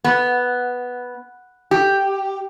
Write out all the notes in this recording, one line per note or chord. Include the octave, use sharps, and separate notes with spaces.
B3
G4